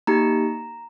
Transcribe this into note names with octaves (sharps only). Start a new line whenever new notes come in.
A#3 D#4 G4 A#5